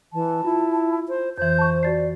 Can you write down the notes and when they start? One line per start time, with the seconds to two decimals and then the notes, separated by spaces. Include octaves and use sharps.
0.13 E3 A5
0.44 E4 F4
1.09 C5
1.38 F2 E3 C5 G6
1.59 A5 C#6
1.83 F#4 D5 A6 C7